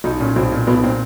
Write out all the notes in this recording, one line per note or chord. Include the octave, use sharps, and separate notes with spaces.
B1 D#4
A#2 C#4
B1 C4
A#2
B1 B3
A#2 C4